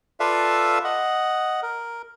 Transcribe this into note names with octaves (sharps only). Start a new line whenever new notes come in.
F4 A4 B4 D5 E5 F5
D#5 F#5
A#4